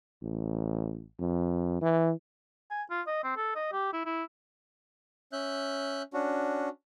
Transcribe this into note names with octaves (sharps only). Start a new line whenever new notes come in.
A1
F2
E3
G#5
F4
D#5
C4
A4
D#5
G4
E4
E4
C#4 E5 F#6 G6
C#4 D4 F#4